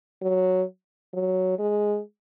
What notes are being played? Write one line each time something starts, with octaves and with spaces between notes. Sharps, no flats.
F#3
F#3
G#3